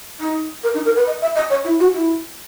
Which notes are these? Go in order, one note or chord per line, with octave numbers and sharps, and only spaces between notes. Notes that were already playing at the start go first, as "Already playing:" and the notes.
D#4
A#4
D#4
A#4
B4
D#5
E5
D#5
C#5
E4
F#4
E4